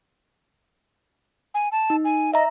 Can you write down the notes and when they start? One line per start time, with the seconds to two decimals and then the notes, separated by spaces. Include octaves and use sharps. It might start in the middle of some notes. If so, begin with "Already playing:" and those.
1.54 G#5
1.72 A5
1.90 D#4
2.05 G#5
2.34 D#5 E5 A#5